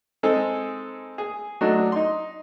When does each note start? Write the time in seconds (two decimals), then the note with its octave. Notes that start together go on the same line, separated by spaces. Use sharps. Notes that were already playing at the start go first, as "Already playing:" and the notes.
0.23 G#3 C4 D#4 G#4 A4
1.18 G#4
1.61 F#3 A3 D4 D#4
1.92 D#4 C6